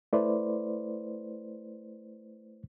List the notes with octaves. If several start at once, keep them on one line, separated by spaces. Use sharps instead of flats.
A3 E4 B4 C5 D5